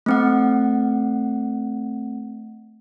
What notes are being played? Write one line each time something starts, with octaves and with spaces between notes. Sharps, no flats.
A3 C4 F#5